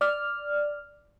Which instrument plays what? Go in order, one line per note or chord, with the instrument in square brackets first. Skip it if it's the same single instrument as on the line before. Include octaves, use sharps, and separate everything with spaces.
[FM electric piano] D5 F6